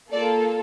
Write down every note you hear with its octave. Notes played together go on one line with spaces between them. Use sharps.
A#3 F4 A4 D5